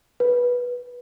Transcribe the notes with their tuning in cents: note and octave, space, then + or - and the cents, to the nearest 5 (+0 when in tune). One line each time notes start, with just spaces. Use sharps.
B4 -15